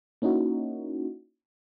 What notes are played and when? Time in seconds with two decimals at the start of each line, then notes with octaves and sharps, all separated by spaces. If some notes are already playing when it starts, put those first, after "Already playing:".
0.22 A#3 C#4 D#4 E4 F#4